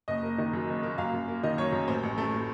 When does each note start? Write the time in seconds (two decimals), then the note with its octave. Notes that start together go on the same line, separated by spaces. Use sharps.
0.08 F#1 D#5
0.23 A#3
0.38 D#3
0.53 F#2
0.68 F#1
0.83 A#3
0.98 F#2 F5
1.13 F#2
1.28 A#3
1.43 D#3 D#5
1.58 F#2 C#5
1.72 F#2
1.88 A1 C5
2.03 A1
2.18 A3
2.33 A2